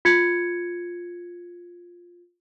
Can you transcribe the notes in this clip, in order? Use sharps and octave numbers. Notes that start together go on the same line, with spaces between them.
F4 G#6 C#7